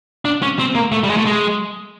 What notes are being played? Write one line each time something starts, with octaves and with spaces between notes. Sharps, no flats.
D4
C#4
C4
A#3
A3
G3
G#3
A3
G#3